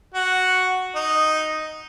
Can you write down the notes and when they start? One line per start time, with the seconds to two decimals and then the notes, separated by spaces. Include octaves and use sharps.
0.14 F#4
0.95 D#4